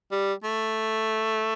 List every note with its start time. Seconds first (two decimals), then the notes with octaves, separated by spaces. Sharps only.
0.11 G3
0.44 A3